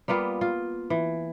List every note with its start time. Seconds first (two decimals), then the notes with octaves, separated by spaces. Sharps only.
0.08 G3 A#3 B3 F4
0.41 F4
0.90 E3